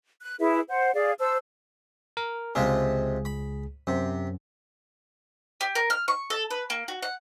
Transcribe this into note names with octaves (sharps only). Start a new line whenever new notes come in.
F#6
E4 G#4 B4 E5
C5 F#5
G#4 D5 F5
C5 A5 E6
A#4
C#2 C3 F3 G#3 G#4
B5
F#2 C3
G4
A#4
F6
C#6
A4
B4
A#3
F#4
F#5